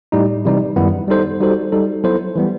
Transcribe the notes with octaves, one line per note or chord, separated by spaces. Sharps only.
A2 G3 D#4
C3 E3 G3 D#4
F#2 D#3 G3 B3 E4
G3 D#4 A4 C5
G3 D#4 F#4 A4 C5
G3 D#4 A4
F#3 B3 E4 A4 C5
E3 G3 B3